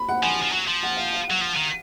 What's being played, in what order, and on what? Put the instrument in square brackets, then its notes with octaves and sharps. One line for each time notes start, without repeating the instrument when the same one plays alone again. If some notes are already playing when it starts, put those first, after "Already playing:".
Already playing: [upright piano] B5
F#5
[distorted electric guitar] F3 [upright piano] G#5
[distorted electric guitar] F3
F#3
F3
[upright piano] F#5
F5
F5
[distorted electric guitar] F#3 [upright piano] F#5
[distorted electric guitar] F3
D#3